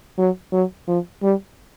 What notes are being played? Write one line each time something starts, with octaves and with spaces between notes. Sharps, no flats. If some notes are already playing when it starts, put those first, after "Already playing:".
F#3
F#3
F3
G3